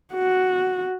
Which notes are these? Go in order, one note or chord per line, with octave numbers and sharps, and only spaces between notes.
F#4